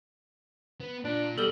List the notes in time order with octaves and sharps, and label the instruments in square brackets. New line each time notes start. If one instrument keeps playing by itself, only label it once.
[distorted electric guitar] B3
[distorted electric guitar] A#2 [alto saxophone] D4
[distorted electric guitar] B2 G#3 [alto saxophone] G3 [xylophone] A4 F#7 G7